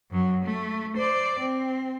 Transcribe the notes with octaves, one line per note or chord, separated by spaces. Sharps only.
F#2 F#3
A3
C5 D5
C4